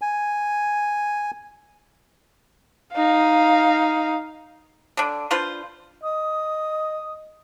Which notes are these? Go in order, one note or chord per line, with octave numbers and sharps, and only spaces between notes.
G#5
D#4 F5
D3 D4
D4 F4 B4 C5
D#5 D#6